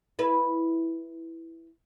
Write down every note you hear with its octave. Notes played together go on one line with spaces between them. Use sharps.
E4 B4